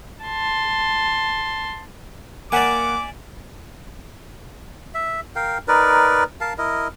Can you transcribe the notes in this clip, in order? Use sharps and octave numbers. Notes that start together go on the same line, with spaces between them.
A5 C6
A#3 A#4 D5 E5 F#5 G#5 D6
E5
A#4 F5 G5
D#4 A#4 B4 D5
A#4 F5 A5
E4 A#4 D#5